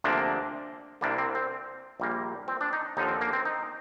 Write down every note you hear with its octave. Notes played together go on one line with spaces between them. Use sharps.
D2 C3 F3 A#3 D4
C2 C3 G3 A#3 D4
C4
C4
A#1 A#2 G3 A#3
C4
D4
D#4
D#2 D3 F3 D#4
C4
A#3
C4
D#4